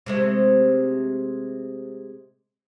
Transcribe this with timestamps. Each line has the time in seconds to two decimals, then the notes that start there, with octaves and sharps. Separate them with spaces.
0.06 C3 G#3 A3